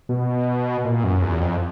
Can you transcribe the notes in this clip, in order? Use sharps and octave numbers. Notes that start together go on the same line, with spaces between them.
B2
A#2
F#2
E2
F2